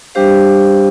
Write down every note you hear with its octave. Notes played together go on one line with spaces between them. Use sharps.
G3 D4 G4 C5 F5